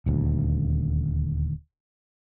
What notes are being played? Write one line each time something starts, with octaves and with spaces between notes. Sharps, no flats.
D#1 D2